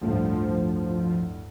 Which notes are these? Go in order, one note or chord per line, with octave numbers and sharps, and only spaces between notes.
A1 D2 G2 F3